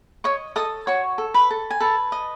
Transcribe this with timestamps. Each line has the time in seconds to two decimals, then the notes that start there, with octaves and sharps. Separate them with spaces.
0.24 C#5 D#5 C#6
0.56 A4 D#5 D#6
0.87 F#4 C#5 C#6
1.18 A4
1.34 B4 B5
1.50 A4
1.70 G#5
1.80 A4 B4 A5
2.12 D#5